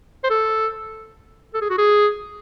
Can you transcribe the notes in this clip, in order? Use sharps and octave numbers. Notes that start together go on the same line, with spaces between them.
C5
A4
A4
G#4
F#4
G#4